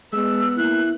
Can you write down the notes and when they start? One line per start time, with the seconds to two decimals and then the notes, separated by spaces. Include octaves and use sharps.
0.13 G#3 B3 E6
0.58 A#3 E4 F#6